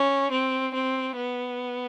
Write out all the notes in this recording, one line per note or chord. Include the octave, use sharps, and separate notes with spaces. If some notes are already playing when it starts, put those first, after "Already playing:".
Already playing: C#4
C4
C4
B3